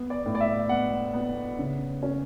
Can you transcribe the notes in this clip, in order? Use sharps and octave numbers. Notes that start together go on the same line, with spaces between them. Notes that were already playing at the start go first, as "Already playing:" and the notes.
Already playing: B3
D5
A2
D5
E5
B3 F#5
B3
C#3
C#4